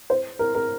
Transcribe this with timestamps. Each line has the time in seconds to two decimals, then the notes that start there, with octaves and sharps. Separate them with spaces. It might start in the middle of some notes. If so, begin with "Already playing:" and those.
0.10 C5
0.39 A#4
0.55 A#4